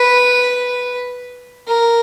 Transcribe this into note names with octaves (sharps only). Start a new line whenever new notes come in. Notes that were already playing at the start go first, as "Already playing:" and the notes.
Already playing: B4
A#4